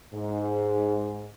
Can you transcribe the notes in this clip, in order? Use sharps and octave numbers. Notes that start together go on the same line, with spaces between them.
G#2